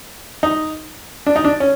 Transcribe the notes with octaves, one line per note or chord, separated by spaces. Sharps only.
D#4
D4
D#4
D4
C#4